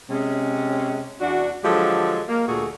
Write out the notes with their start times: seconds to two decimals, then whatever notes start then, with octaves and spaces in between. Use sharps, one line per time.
0.10 C3 G#3 C#4
1.21 E2 D4 F#4
1.63 D3 F3 F#3 G#3 G4 A4
2.28 A#3
2.47 D2 A#2 A3 F#4 G#4